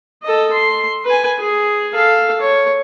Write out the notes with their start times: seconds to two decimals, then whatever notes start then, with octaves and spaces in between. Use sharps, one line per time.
0.23 A4 D#5
0.52 C6
1.05 B4 G#5
1.39 G#4
1.94 A4 F5
2.41 C#5